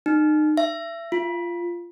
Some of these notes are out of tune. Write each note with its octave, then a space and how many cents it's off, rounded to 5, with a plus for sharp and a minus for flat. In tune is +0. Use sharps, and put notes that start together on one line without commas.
D#4 -30
E5 +30
F4 -10